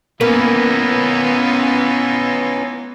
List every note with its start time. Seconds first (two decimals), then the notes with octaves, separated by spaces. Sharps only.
0.21 E3 A#3 B3 C#4 D#4 F4 B4